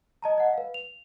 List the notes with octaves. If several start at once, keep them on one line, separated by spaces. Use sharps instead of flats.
D#5 A5 A#5
D#5 F#5
B4 F5
F7